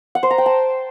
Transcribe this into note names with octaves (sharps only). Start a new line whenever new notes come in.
F#5
C5
A#5
G5
A5